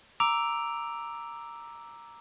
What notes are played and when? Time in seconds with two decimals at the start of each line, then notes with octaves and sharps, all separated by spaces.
0.20 A#5 D6 E6 D7 F7